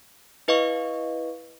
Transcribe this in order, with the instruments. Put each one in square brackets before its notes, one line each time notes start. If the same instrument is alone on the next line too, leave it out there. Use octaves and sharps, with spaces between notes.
[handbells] E4 B4 D#5 F5 C#6